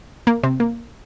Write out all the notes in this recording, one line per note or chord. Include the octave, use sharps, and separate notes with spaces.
A#3
C3 C4
A#3